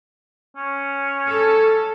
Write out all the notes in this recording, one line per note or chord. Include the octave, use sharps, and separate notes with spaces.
C#4
A4